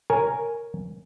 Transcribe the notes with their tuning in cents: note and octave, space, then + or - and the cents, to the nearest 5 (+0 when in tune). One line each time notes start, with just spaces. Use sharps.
A#4 +0 C#5 +0 G#5 +0